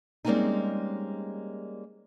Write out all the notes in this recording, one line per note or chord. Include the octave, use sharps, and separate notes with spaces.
G3 G#3 A#3 C4 C#4 D#4